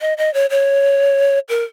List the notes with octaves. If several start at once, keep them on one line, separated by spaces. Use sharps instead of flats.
D#5
D#5
C#5
C#5
A#4